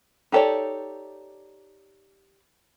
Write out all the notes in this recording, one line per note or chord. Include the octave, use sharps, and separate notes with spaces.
D#4 G4 A4 C#5 D5